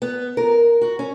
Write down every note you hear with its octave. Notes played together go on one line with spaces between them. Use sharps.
B3
A#4
F#4
C#4